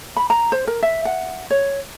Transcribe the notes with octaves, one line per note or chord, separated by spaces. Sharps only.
B5
A#5
C5
A#4
E5
F#5
C#5